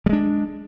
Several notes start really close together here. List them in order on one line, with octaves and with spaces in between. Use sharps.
G3 G#3 D4